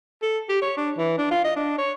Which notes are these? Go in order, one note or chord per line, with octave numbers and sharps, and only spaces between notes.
A4
G4
C#5
D4
E3
D4
F4
D#5
D4
C#5